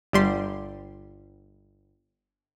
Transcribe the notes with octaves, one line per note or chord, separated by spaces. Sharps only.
G1 G3 C6